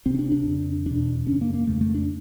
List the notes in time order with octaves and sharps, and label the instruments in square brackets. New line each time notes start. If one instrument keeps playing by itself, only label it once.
[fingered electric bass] C#2 C3 C4
C#4
D4
D4
F2 C#3
E2 B2 D4
F#2 C#3 C#4
A#3
A#3
F2 C#3 A3
A3
D4